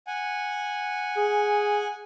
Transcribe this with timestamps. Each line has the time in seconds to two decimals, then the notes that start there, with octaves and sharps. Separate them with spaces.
0.07 F#5 G#5
1.17 G#4